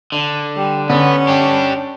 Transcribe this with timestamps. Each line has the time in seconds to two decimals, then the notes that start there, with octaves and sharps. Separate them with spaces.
0.12 D3
0.56 G3
0.90 D3 B3 C#4
1.28 D4 G4